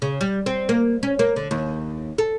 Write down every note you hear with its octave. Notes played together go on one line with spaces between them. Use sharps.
C#3
G3
C4
A#3
C#4
A#3
D3
D#2
A4